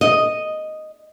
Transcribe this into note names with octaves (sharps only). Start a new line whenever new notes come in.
D#5